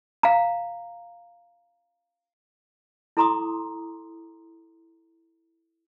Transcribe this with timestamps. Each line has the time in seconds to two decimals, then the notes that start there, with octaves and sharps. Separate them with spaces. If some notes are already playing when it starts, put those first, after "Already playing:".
0.23 F5 A#5
3.17 E4 A4 A#5 C6 D6 D#6